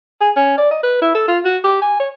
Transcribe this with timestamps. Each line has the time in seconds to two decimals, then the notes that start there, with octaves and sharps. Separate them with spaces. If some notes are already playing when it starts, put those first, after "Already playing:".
0.21 G#4
0.36 C#4
0.58 D5
0.71 D#5
0.83 B4
1.02 E4
1.15 A4
1.28 F4
1.45 F#4
1.64 G4
1.82 G#5
2.00 C#5